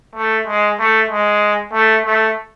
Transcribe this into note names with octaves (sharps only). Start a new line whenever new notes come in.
A3
G#3
A3
G#3
A3
A3